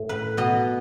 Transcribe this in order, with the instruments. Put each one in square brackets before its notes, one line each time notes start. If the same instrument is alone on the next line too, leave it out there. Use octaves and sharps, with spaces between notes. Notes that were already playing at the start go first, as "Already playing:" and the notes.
Already playing: [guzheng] A2
B4
B2 D#5